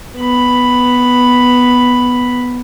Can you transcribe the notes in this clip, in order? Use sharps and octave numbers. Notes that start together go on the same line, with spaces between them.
B3 B5